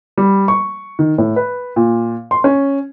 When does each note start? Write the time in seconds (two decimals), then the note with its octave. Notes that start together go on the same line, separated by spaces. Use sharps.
0.17 G3
0.48 C#6
0.99 D#3
1.18 A2
1.36 B4
1.76 A#2
2.31 C6
2.44 C#4